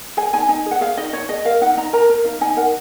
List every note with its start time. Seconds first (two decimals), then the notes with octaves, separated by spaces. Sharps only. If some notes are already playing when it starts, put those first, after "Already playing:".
0.17 G#4 G#5
0.33 D#4 G#5
0.49 D#4 G#5
0.66 G#4
0.71 F#5
0.81 G#4 F5
0.97 D#4 D#5
1.13 D#4 C#5
1.29 G#4 D#5
1.45 A#4 F5
1.61 D#4 F#5
1.77 D#4 A#5
1.93 A#4 A#5
2.09 A#4
2.25 D#4 F5
2.41 D#4 G#5
2.57 A#4 F#5